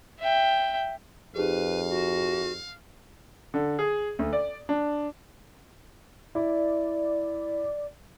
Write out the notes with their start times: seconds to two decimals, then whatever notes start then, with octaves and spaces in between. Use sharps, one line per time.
0.20 E5 G5
1.36 F2 D#4 G4 G#4 B4 F5
1.89 F#4
3.54 D3
3.79 G#4
4.19 D2
4.33 D5
4.69 D4
6.35 E4 D5